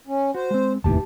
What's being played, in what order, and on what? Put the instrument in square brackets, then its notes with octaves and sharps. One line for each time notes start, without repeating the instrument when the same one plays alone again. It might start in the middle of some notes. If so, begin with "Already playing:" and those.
[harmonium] C#4
[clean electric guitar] F#4 [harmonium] C5
[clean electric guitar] G#3 C4
[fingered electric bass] F1 D#2 A2 [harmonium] E3 [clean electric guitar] G4 A5